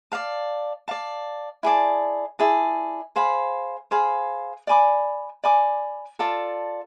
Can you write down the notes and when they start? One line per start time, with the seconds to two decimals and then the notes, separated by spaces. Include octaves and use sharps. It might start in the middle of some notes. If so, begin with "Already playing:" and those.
0.12 D5 F5 A5
0.88 D5 F5 A5
1.63 E4 G#4 D5 A5
2.39 E4 G#4 D5 A5
3.16 G#4 C5 F5 B5
3.91 G#4 C5 F5 B5
4.67 D5 G#5 B5 D6
5.44 D5 G#5 B5 D6
6.19 F4 A4 D5 A5